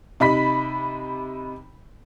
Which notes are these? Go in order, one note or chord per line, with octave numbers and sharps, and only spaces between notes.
C3 D#4 B5 B6